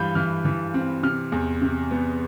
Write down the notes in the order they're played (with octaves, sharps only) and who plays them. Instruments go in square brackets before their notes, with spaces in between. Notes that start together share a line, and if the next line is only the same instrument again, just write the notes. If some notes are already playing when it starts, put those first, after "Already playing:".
Already playing: [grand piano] G2 E3 G3 F5 B5 G6
E3 F6
E3
C4
C3 F6
E2
C3
B3